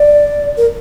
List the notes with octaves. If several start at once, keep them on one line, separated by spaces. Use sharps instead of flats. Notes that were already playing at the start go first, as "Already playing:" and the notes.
Already playing: D5
A#4